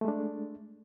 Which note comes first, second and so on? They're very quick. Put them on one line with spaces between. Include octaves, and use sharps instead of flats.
A3 G#3 D4